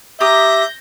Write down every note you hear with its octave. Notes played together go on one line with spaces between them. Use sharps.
G4 E5 A#5 D#6 G6 A#6